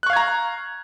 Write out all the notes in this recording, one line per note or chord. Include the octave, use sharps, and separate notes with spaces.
F5 A#5 C#6 F#6 G#6